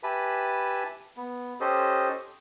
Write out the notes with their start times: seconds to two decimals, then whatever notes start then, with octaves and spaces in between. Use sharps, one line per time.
0.03 G4 B4 E5 G#5 A5 B5
1.17 B3
1.60 C#4 G4 A4 C5 D#5